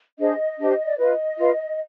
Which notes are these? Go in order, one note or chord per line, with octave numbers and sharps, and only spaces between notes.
D4 G#4 C5 D#5
D4 G4 C5
D5
F4 B4 D#5
F4 B4